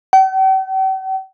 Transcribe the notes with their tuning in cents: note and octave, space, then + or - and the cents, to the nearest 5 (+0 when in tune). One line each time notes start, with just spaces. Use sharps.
G5 -45